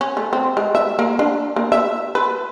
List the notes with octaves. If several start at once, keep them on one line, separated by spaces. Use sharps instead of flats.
C#4
A3
C4
G#3
E5
A#3
D4
A#3
E5
B4